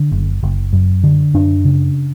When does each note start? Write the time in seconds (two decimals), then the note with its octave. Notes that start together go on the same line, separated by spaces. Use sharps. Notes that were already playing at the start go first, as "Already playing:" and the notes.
Already playing: D3
0.11 F#1
0.43 F#1
0.73 F#2
1.03 D3
1.34 F#2 D4
1.65 C#3